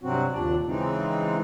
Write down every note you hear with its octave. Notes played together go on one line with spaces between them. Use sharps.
G2 C3 F#3 C4 F#4
D#2 A#2 D4 D5
C#3 E3 G#3 C4 D#4